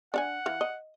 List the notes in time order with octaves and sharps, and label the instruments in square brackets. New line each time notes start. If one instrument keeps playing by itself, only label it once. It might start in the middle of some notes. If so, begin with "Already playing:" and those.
[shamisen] D4 F5 G#5 [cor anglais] F#5
[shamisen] E3 F5
D#5